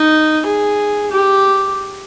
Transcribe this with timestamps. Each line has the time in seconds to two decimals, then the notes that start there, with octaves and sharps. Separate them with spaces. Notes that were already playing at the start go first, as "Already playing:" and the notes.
Already playing: D#4
0.46 G#4
1.12 G4